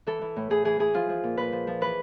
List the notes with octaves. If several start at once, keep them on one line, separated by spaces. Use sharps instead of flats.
E3 A4
E3
A2
A2 G#4
E3 G#4
E3 G#4
F3 F4
F3
A#2
A#2 B4
F3
F3
E3 B4